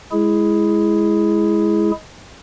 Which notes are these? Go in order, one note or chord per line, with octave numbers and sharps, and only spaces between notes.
G#3 E4 G#4